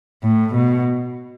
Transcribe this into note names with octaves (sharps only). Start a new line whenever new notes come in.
A2
B2